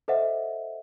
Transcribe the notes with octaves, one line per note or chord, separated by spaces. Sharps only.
A4 C5 D#5 E5 F#5